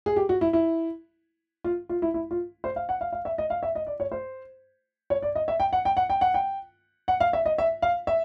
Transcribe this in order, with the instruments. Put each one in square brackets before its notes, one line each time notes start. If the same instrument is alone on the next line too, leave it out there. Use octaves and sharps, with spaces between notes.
[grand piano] G#4
G4
F#4
E4
E4
F4
F4
E4
E4
F4
C5
F5
F#5
F5
F5
E5
D#5
F5
E5
D#5
D5
C#5
C5
C#5
D5
D#5
E5
G5
F#5
G5
F#5
G5
F#5
G5
F#5
F5
E5
D#5
E5
F5
E5